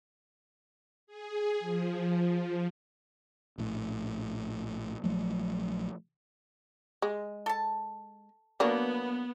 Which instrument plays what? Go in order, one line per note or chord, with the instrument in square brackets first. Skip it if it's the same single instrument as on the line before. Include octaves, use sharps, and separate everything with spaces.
[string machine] G#4
F3
[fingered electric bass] A#1 A2
A#1 F3 F#3 A3
[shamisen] G#3
[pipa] A4 A5
[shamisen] F#3 A#3 D4 [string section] B3